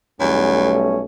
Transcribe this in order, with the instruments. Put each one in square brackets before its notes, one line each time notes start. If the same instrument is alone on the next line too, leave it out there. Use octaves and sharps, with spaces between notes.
[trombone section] B1 G3 A3 [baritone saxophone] E2 [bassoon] C#4